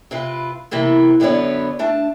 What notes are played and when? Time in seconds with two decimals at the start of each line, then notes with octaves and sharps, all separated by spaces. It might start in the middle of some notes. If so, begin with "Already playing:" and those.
0.11 C3 F4 B4
0.71 C3 E3 A#3 B3
1.20 F#2 D3 B3 B4 C#5 D5
1.79 A3 D4 A5